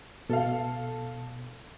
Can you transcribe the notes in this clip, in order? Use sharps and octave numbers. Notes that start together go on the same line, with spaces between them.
B2 A4 F5